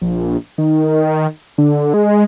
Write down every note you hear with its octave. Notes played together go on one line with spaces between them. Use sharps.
A#1
D#3
D3
G#3